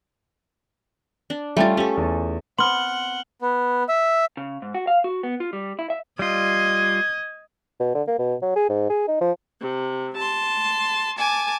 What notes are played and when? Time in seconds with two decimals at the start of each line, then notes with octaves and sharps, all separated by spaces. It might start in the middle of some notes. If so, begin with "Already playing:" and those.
1.30 D4
1.57 G3 A3 C#4 F4 G5 A6
1.77 C#4 G4 A4
1.97 E2
2.59 B3 C4 F#5 C6 F6 F#7
3.41 B3
3.89 E5
4.37 C#3
4.62 G#2
4.75 F#4
4.87 F5
5.04 F#4
5.23 B3
5.40 F4
5.53 G3
5.79 E4
5.90 E5
6.19 G3 F4 D#5 G#6
7.80 B2
7.95 D3
8.07 A#3
8.19 B2
8.42 F#3
8.56 G#4
8.69 G#2
8.90 G#4
9.08 D#4
9.21 F3
9.60 C3
10.17 A5 C6
11.18 G#5 A5 D6